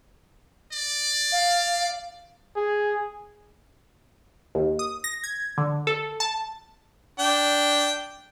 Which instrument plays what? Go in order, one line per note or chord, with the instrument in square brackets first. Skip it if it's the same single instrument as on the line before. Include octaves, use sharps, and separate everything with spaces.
[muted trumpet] D5
[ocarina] F5
[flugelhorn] G#4
[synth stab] D#2
D#6
A#6
G#6
D3
A4
A5
[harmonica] D4 G5